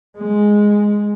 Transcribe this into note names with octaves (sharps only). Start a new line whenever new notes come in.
G#3